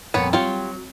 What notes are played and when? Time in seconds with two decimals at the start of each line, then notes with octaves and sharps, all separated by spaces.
0.14 F2 A#2 B3 C#5
0.33 F#3 F4 G4 C#5